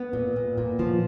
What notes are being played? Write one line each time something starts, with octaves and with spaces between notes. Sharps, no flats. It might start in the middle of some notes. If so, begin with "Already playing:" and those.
Already playing: B3
A#2
A#2
A#2
F3